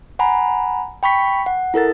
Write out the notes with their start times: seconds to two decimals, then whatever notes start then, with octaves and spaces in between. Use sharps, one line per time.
0.19 F#5 G#5 A#5 B5
1.03 G5 B5 C#6 B6
1.46 F#5
1.74 E4 A4 A#4 A6